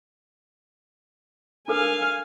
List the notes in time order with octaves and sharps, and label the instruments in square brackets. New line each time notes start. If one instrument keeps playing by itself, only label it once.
[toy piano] D4 A4 A#4 [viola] F5 G#5